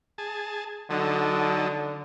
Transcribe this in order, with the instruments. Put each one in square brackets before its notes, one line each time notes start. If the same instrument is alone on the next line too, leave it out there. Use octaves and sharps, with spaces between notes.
[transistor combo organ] G#4 A5
[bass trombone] D3 [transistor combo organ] F#3 D#4 A4